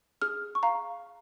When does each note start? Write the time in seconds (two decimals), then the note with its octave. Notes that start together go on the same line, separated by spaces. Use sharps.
0.22 G#4 F6
0.55 C#6
0.63 F5 A#5